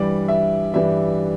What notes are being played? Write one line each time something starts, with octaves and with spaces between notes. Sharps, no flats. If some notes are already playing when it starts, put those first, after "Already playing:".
Already playing: G2 E3 G3 D5
E5
G2 E3 G3 E5